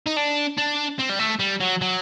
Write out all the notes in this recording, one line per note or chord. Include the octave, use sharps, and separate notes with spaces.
D#4
D4
D4
C4
G3
A3
G3
F#3
F#3